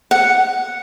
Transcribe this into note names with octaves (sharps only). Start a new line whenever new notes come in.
F#5